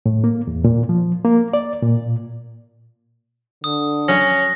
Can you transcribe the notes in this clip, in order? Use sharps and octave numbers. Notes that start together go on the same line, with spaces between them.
A2
A#3
E2
A#2
F3
A#3
D5
A#2
D3 D#6
F#3 C#4 A#6